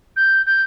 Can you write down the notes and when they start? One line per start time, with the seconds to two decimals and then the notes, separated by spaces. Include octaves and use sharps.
0.16 G6
0.46 G6